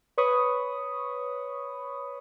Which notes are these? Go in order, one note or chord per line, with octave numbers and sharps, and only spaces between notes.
B4 C#5 B5 C#6 D#6